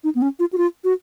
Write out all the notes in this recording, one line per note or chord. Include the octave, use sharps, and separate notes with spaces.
D#4
B3
C#4
F4
F#4
F4
F#4